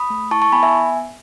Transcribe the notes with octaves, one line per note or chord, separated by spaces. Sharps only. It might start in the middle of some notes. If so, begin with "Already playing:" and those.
Already playing: B5 D#6
A3
E4 A5 C#6
A5 C#6
B3 G#5 B5
E5 G#5